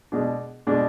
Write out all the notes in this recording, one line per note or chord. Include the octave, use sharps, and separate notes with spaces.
B2 G#3 D4
B2 G#3 D4